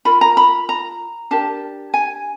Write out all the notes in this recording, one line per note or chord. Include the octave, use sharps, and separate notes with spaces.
F4 A#4 B5
A#5
B5
A#5
D4 G4 A#4 A5
G#5